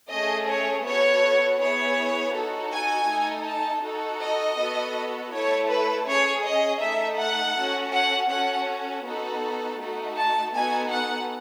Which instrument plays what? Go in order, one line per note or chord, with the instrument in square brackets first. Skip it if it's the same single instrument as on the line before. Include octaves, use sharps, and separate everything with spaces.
[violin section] A3 C#4 G#4 D#5
C#5
B3 F#4 A4 C#5
B3 E4 G#4 C#5
D#4 F#4 A4
G#5
A3 D#4 A4
A5
D#4 F#4 A4
D#5
B3 F#4 A4
A3 E4 A4 C#5
B4
C#4 G#4 C#5
D#5
A3 D#4 A4 E5
F#5
C#4 F#4 A4
F#5
C#4 F#4 A4 F#5
B3 D#4 F#4 A4
A3 D#4 F#4 A4
A5
B3 D#4 F#4 A4 G#5
F#5